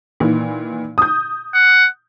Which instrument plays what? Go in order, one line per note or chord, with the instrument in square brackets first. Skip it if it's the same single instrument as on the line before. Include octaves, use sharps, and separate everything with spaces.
[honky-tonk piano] A#2 D#3 E3
D#6 G6
[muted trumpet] F#5